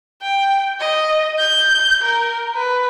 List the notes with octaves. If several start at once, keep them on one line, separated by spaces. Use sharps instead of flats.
G5
D#5
G6
A#4
B4